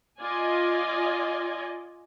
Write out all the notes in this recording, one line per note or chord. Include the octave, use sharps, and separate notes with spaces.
F4 D5 D#5 G#5